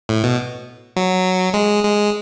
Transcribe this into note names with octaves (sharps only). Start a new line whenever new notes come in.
A2
B2
F#3
G#3
G#3